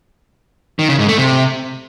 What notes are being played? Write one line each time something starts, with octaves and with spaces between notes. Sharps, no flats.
D#3
C#3
G#2
A3
C3